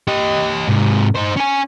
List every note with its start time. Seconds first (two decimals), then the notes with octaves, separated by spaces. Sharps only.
0.08 G4 D#5
0.68 G#2 C3
1.16 D#4 C5
1.37 C#4 G#5